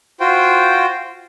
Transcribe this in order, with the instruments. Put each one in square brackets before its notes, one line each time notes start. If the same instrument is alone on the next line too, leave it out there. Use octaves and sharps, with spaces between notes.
[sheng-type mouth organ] F4 F#4 C5 G5